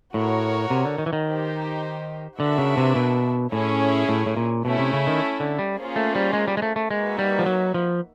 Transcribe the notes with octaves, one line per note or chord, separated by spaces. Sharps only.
A2 F#4 A#4 C#5
C3
D3
D#3
E3
D#3
D#4 G4 C5
D3 A#3 D4 F#4 B4 E5
C#3
C3
B2
A2 C#4 E4 G#4 C#5
A2
A2
A#2
B2 A3 C#4 E4
C3
C#3
D#3
D3
G3
A#3 C#4 F4 G#4 C5
A3
G3
G#3
G3
G#3
A3
A3
G#3 A#3 D#4 F#4 B4 E5
G3
F3
F#3
F3